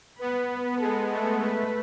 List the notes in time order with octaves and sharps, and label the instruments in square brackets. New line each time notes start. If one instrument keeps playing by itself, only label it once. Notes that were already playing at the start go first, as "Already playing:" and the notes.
[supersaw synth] B3 [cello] B4
[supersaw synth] G#3 [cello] A4
[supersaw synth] A3 [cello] A4
[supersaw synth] A3 [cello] B4